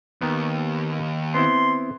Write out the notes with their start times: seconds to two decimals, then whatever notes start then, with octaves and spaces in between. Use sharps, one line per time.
0.22 D#2 D#3 B3
1.34 B3 C4 E4 C6